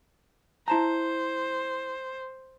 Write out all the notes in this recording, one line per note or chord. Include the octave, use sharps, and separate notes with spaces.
E4 C5 A5 A#5